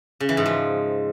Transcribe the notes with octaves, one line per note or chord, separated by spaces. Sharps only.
C#3
E3
G#2
F3